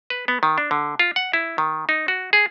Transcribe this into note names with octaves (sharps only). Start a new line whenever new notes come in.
B4
B3
D#3
D4
D3
F4
F#5
E4
D#3
D#4
F#4
G#4